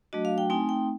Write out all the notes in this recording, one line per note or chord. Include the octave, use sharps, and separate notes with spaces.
F#3 A3 D4 F#4 D#5
F5
G5
A3 C4 D#4 G#5
G5